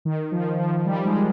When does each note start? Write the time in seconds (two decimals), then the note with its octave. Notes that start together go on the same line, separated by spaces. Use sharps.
0.05 D#3
0.32 F3
0.59 F3
0.86 G3
1.05 G#3